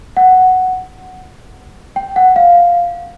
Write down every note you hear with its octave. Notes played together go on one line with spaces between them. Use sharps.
F#5
G5
F#5
F5